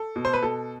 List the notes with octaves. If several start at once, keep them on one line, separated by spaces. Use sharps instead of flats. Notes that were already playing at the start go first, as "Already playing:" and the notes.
Already playing: A4
B2
C5
B4
B2 A4